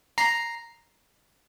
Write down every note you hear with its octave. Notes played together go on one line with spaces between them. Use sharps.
A#5 C7